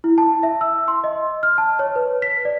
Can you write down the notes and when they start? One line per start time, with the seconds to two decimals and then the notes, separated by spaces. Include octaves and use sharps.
0.04 E4
0.18 A5
0.43 E5
0.61 E6
0.88 C6
1.04 D#5
1.43 F6
1.58 A5
1.79 C#5
1.96 B4
2.22 B6
2.45 D5